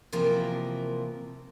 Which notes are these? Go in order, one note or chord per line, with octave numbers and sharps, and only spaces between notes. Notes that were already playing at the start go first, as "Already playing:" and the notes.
C3 E3 F3 A#3 A#4